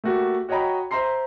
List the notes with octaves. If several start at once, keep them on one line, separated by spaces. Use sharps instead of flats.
A3 A#3 F#4 G4
F#4 C#5 D#5 G5 A#5 B5
C5 E5 A#5 C6 C7